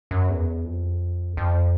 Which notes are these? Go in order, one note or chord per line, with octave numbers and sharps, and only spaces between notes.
F#2
E2
F2
F2